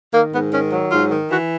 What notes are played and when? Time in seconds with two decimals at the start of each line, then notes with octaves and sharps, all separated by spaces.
0.14 D#3 A#3
0.33 G#2 B3
0.53 D#3 C#4
0.72 F#3
0.91 G#2 F4
1.11 D#3
1.31 E3 F#4